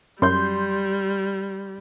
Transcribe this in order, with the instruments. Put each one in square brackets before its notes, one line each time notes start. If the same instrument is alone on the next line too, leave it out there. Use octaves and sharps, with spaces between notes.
[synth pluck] F#2 [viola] G3 [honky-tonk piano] C6 G6